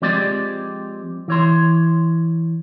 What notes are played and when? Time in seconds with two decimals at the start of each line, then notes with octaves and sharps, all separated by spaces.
0.02 F3 G#3 C4 G4 D5
1.28 E3 C#5 C6